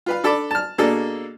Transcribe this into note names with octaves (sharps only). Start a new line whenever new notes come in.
F4 B4 F5
D4 A4 A5 B5 D6
A5 F6
B2 A#3 D4 G#4 A4